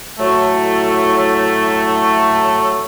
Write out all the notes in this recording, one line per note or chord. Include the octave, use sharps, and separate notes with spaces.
A2 F#3 A3